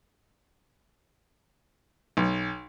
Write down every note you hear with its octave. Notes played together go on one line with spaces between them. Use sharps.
B1